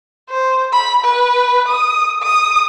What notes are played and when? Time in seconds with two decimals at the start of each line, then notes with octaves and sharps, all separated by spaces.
0.30 C5
0.72 B5
1.04 B4
1.68 D#6
2.22 D#6